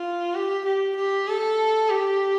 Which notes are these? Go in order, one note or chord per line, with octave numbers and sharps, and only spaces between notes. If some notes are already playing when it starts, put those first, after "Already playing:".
Already playing: F4
G4
G4
G4
A4
G4